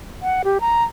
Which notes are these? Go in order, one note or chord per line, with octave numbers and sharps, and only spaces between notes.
F#5
G4
A#5